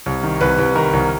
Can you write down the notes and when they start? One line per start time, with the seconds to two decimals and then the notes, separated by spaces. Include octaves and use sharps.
0.06 C2
0.23 D#3
0.41 C2 B4
0.58 C2
0.76 D#3 A#4
0.93 C2